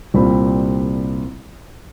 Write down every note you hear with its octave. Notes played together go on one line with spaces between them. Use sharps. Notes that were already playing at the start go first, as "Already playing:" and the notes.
C2 A#2 G3 C4 F4 B5